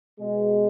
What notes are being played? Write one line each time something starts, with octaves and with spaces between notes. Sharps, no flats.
B2 G#3